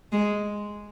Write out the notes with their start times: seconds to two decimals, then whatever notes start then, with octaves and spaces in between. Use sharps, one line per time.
0.12 G#3